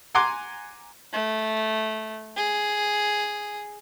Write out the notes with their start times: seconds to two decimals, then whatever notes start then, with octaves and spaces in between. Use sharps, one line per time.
0.15 F#5 G#5 A#5 C6 D6
1.13 A3
2.36 G#4